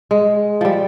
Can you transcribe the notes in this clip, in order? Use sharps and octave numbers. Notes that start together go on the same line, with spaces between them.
G#3
F3 G3